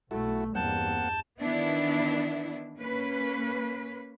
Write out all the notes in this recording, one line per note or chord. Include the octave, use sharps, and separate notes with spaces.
B1 A3 E4 F#4 A4
E2 G2 G3 A#3 C4 F#5 A5 G6
D#3 E3 B3 D4 E4
A#3 C#4 B4